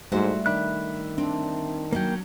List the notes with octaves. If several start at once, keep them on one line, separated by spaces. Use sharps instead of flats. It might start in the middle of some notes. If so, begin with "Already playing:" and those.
G#2 G3 A3 E4 F#4 C5
D#3 D4 E5 B5 F#6
C4 D4
F#3 A#3 C#4 G5